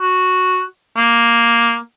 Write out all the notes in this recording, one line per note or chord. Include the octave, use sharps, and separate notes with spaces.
F#4
A#3